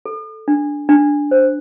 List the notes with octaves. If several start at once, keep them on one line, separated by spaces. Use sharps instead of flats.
A4
D4
D4
C5